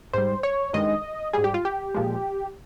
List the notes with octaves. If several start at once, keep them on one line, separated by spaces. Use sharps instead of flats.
G#2 G3 C5
C#5
G2 D#3 G#3 D#5
G#2 G3 G#4
G4
F4
G4
A#2 F3 G#3